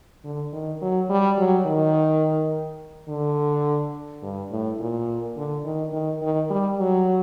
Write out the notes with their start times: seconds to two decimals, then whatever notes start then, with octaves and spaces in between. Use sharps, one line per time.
0.24 D3
0.53 D#3
0.82 F#3
1.10 G3
1.38 F#3
1.66 D#3
3.08 D3
4.22 G2
4.51 A2
4.80 A#2
5.36 D3
5.64 D#3
5.93 D#3
6.22 D#3
6.50 G3
6.79 F#3